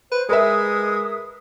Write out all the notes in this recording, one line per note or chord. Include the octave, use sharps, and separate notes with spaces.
B4 C5
G#3 A#4 B4 E5 D#6